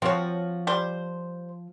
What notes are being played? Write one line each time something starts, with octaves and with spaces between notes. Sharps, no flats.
F3 C4 F#4 C#5
G3 C5